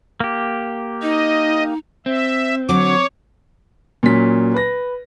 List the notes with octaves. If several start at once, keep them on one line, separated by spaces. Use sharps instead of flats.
A#3 G4
D#4 D#5
C4 E5
D3 F#3 C#5 D6
A#2 F#3 C#4 B6
B4 A#6